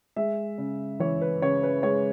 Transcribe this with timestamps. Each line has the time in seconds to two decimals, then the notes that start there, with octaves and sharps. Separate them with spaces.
0.16 G#3 E5
0.58 C#3
1.00 E3 C#5
1.21 B4
1.42 C#3 C#5
1.63 B4
1.83 G#3 C#5